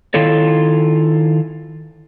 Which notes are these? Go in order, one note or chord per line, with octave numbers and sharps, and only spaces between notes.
D#3 E4 F4 A4 C#5